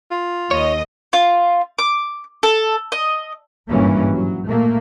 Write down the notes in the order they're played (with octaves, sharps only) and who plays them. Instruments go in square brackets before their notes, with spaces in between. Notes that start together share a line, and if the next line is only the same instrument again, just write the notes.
[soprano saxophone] F4
[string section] D#2 D#5 [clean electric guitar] C#5
[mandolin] F4
D6
A4
D#5
[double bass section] G#1 G2 A#2 E3 A#3 C#4
F#3
A#2 A3 A#3